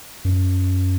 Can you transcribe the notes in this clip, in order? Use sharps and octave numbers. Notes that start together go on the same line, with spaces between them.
F#2